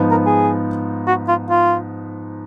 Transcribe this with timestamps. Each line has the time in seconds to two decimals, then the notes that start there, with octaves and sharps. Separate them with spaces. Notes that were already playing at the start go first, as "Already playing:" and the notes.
Already playing: G#2 F3 B3 D#4
0.11 A#4
0.26 G#4
1.07 F#4
1.28 F4
1.50 F4